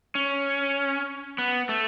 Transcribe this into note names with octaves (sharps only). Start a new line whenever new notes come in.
C#4
B3
A3